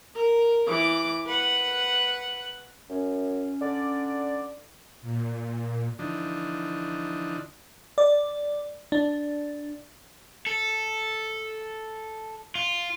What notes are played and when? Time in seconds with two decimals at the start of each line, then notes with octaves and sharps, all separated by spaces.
0.15 A#4
0.67 E3 D6
1.27 B4 F#5
2.89 F#2 C#4
3.61 D3 D5
5.01 A#2
5.99 D3 E3 F3 D4 D#4
7.98 D5
8.92 D4
10.47 A4
12.55 F4